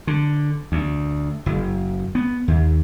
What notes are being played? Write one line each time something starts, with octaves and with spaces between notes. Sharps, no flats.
D3
D2
F#1
B3
D#2